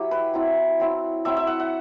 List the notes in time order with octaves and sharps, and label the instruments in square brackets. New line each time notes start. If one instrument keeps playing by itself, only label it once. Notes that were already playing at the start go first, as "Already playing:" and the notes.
Already playing: [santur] F#3 E4 G4
B4
F#3 C4 E4
F#3 C4 E4
F#3 C4 E4 E5
E5
F#5
F#5